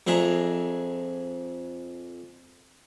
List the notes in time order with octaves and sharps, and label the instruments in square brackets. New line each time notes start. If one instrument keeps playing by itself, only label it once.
[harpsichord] F2 D4 G#4 E5 A#5